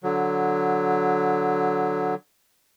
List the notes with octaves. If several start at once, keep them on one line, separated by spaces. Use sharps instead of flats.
D3 F#3